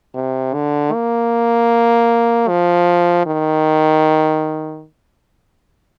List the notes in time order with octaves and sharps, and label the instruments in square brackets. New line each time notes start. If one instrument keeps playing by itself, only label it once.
[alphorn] C3
D3
A#3
F3
D#3